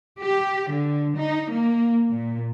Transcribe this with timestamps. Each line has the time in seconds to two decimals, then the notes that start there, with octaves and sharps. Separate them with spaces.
0.22 G4
0.70 D3
1.17 D#4
1.52 A#3
2.10 A#2